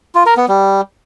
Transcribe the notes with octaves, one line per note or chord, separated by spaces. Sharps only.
F4
A#4
B3
G3